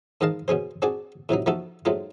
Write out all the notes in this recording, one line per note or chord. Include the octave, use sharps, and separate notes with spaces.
G#2 D#3 D#5 F5 A5
B2 C#4 G#4 C5
C4 D4 F#4 G#4 D5
A2 C3 F#3 D#4
F3 A3 D#4 F#4 A4
G#2 F#3 A3 D#4 F4